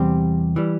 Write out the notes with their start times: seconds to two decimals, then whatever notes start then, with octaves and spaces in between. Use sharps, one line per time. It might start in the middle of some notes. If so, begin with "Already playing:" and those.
Already playing: E2 C3 G3 C4 G4
0.56 E3 G3